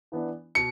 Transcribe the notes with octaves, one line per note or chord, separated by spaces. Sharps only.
E3 B3 D4
B2 C#7